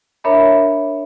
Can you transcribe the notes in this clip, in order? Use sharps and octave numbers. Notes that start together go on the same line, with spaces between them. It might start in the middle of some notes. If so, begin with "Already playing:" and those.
D4 A#4 C#5 E5 A#5 B5